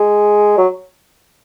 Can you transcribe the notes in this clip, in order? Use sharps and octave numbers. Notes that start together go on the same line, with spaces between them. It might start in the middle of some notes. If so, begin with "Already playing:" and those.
Already playing: G#3
F#3